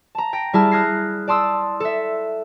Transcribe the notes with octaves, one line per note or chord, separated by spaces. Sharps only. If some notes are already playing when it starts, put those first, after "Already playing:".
A5 A#5
G5 A#6
G3 E4 G#4 A5 F6
D#6 F6 F#6 G#6 A#6 C7
D5 A5 C6 D#6 E6
A4 E5